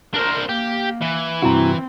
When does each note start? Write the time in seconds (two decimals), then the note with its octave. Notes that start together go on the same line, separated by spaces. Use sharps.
0.14 D4 A#4 C5
0.49 A#3 G4
1.02 E3
1.42 G2 C3 C4 E4 F#4 A#5